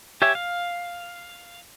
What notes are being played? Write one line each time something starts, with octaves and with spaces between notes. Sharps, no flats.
G4 C#5 E5 G#5
F5